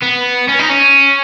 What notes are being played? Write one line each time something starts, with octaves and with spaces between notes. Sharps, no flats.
B3
C#4
D#4
C#4